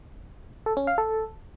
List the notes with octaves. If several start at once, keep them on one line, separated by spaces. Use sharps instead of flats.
A4
C#4
F5
A4